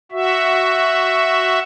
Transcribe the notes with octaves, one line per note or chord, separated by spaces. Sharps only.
F#4 E5